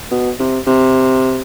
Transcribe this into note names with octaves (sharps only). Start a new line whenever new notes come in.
B2
C3
C3